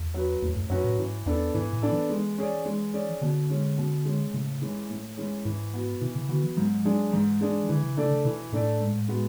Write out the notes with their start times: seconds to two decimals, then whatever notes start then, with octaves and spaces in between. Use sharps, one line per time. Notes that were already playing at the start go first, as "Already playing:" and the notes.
Already playing: E2
0.14 F#3 C#4 F#4 B4
0.42 E2 A2
0.56 F#2
0.70 F#2 F#3 C#4 F#4 B4
0.84 A2
0.98 G#2 E3
1.26 E2 B3 D4 A4
1.54 G#2 E3
1.73 A2
1.82 B3 D4 A4
1.92 E3
2.10 G#3
2.38 C#4 G#4 D5
2.66 G#3
2.94 C#4 G#4 D5
3.21 B2 D3
3.50 G#3 C#4
3.78 B2
4.05 G#3 C#4
4.33 A2 C#3
4.62 E3 G#3 C#4
4.90 A2
5.17 E3 G#3 C#4
5.45 G#2 E3
5.74 B3 F#4
6.01 B2 E3
6.16 C#3
6.29 D3 B3 F#4
6.43 E3
6.57 G#2 F#3
6.85 F#3 G#3 D4 G#4
7.13 G#2 E3
7.41 G#3 D4 G#4
7.69 D3 E3
7.83 C#3
7.97 C#3 A3 D4 A4 D5
8.11 C#3
8.25 B2 E3
8.53 A2 A3 D4 A4 D5
8.80 G#2
9.08 G#3 B3 F#4